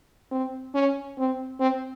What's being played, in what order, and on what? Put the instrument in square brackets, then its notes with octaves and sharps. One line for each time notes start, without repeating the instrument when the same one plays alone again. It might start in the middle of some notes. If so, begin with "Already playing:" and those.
[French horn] C4
C#4
C4
C4